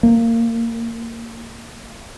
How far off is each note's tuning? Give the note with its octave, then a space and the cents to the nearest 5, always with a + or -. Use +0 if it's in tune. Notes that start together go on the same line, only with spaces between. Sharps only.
A#3 -20